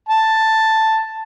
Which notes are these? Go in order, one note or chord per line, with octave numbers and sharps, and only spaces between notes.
A5